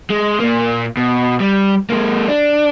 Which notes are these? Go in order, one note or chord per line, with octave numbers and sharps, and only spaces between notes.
G#3
A#2 A#3
B2
G3
G#3 A#3
D4